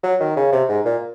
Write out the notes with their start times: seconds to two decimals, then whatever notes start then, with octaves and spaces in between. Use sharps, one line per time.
0.04 F#3
0.20 D#3
0.37 C#3
0.52 C3
0.69 G#2
0.85 A#2